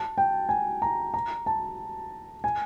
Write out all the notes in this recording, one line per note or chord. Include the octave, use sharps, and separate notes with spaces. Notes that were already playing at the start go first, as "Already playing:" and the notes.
Already playing: A5
G5
G#5
A#5
A#5
A5
G#5